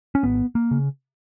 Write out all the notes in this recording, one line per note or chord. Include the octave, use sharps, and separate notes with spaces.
C#4
G#1 B3
A#3
C#3